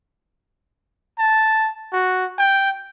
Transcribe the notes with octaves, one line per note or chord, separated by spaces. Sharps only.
A5
F#4
G5